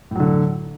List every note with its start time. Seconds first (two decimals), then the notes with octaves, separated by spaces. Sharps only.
0.11 A2
0.15 F#3
0.20 D3